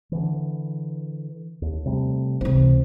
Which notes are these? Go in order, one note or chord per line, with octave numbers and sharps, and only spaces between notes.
D3 E3
D#2
C3 G3 A3
C#2 C3 E3 C4